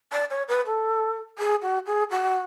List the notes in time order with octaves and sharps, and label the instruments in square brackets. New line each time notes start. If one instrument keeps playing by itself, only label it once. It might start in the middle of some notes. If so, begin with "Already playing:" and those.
[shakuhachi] D5
C#5
B4
A4
G#4
F#4
G#4
F#4